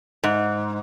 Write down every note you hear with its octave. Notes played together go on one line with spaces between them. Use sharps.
G#2